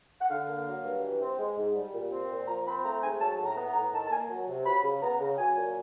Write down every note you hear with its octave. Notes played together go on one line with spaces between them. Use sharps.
F#5
D3 F5
A#3
F#3
G2
E3
C4
G#3
G#2
G3
A#2
C4
A#2
F3 A#5
C4 B5
A3 A#5
G#2 G#5
F#3 A5
A2
A#5
B3
A#5
A2
D#3 A5
A5
A#3 G#5
F#3
C3
F#3 B5
C#3
B3 A#5
C#3
F#3 G#5
A#2